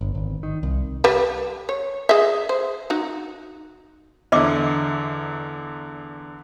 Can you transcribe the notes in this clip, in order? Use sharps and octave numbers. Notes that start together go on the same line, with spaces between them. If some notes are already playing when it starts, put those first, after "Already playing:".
G1
G#1
D#3
C2
G3 B4
C#5
G#4 D#5 E5
C5
D#4 F#4
E2 D3 D#5 E5 D6